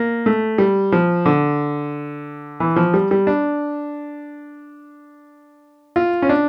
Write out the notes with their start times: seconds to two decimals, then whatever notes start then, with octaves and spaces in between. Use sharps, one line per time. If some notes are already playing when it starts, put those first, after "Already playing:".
Already playing: A#3
0.26 A3
0.58 G3
0.92 F3
1.25 D3
2.60 E3
2.76 F3
2.94 G3
3.11 G3
3.27 D4
5.96 F4
6.22 C#4
6.29 D4